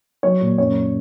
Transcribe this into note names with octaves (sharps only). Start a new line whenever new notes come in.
F#3 C#5
A#2
F#2 C#5